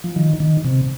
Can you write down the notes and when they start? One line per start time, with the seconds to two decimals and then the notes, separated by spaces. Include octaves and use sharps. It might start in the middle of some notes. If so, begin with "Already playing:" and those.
0.04 F3
0.16 D#3
0.40 D#3
0.64 C3